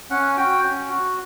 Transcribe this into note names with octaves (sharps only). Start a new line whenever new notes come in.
C#4 F#5
F#4 G5
C#4
F#4